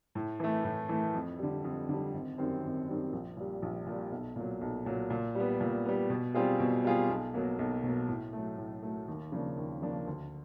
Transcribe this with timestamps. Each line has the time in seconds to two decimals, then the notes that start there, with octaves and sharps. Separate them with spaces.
0.15 A2
0.40 E3 A3
0.64 A2
0.89 E3 A3
1.14 F2
1.39 D3 G3
1.64 F2
1.89 D3 G3
2.14 G#1
2.38 F#2 D#3 G3 C4
2.63 G#1
2.87 F#2 D#3 G3 C4
3.13 A#1
3.37 A#2 G3
3.62 A#1
3.86 A#2
3.92 G3
4.12 B1
4.36 A#2 F#3
4.61 B1
4.86 A#2 F#3
5.10 A#2
5.35 G3 B3
5.61 A#2
5.85 G3 B3
6.10 B2
6.34 G3 C4 F4 G#4
6.60 B2
6.84 G3 C4 F4 G#4
7.09 B1
7.34 B2 F#3 A#3
7.59 B1
7.84 B2 F#3 A#3
8.08 A2
8.33 F#3 A3
8.58 A2
8.83 F#3 A3
9.08 D#2
9.32 C#3 F3 A#3 D4
9.57 D#2
9.82 C#3 F3 A#3 D4
10.07 D2